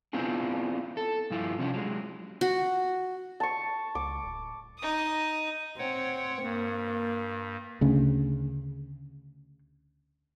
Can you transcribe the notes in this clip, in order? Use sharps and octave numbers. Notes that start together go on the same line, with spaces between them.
B3 C4 D4 E4 F4 G#4
A4
G2 F3 E4 F4
C3 F3 C#4 D4
F#3 G#3
F#4
A5 C#6
C#2 D6
D1
D#4 D#6
C4 C#5 F#5 G5
G2 A#3
D2 C#3